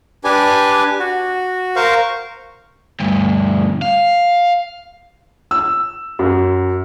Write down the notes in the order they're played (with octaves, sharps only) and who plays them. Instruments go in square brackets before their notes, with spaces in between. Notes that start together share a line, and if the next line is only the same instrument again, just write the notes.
[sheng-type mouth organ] D4 G4 B4 G#5
F#4
A#4 C5 F5 C#6
[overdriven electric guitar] D2 G2
F5
[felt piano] E6
F#2